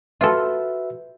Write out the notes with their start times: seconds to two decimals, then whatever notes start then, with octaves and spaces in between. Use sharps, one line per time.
0.21 F4 F#4 A4 B4 E5